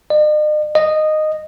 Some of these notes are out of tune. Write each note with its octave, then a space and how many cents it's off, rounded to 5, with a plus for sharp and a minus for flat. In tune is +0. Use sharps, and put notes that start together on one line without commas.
D#5 -45
D#5 -10